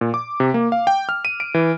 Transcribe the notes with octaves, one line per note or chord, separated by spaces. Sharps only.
A#2
D6
C3
A#3
F5
G5
F6
D#7
D7
E3